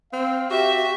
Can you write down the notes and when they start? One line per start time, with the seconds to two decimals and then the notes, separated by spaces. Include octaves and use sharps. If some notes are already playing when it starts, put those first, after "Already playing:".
0.13 C4 F5
0.51 F#4 G4 E5